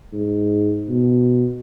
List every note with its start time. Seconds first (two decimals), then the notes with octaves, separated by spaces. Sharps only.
0.13 G#2
0.89 B2